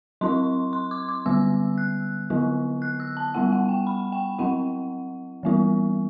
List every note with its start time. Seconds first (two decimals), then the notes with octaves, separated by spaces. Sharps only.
0.21 F#3 C4 E4 C6
0.73 C6
0.91 D6
1.09 D6
1.26 D3 G3 B3 E6
1.78 F#6
2.30 D3 F#3 B3 E4
2.82 F#6
3.00 E6
3.17 A5
3.34 G3 B3 E4 F#5
3.52 F#5
3.69 G5
3.87 B5
4.12 G5
4.39 F#3 C4 E4 F#5
5.43 E3 G3 B3 E4